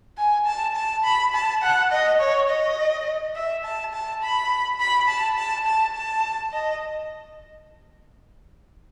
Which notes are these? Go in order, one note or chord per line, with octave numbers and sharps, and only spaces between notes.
G#5
A5
A5
B5
A5
F#5
D#5
C#5
D#5
E5
A5
A5
B5
B5
A5
A5
A5
A5
D#5